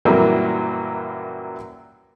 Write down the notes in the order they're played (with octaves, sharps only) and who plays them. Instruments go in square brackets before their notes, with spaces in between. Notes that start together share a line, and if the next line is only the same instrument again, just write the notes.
[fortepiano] F#2 A#2 E3 F#3 G3 A#3